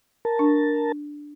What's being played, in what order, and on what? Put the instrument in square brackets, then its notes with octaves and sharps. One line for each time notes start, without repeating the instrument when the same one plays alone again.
[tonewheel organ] A#4 A5
[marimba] D4